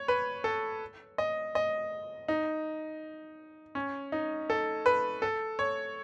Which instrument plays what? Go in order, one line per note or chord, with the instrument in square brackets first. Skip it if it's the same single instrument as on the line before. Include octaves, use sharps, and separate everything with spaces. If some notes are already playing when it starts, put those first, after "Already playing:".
Already playing: [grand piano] C#5
B4
A4
D#5
D#5
D#4
C#4
D#4
A4
B4
A4
C#5